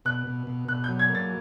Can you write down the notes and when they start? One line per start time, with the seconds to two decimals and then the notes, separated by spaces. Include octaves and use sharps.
0.05 B2 F#6
0.27 B2
0.47 B2
0.68 B2 F#6
0.84 G6
0.89 F#3
0.99 G#6
1.09 A#3
1.15 A6